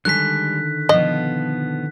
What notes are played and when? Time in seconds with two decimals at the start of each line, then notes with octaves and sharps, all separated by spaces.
0.05 D3 D#3 G3 G#3 A4 F#6 B6
0.89 B2 F3 B3 D#5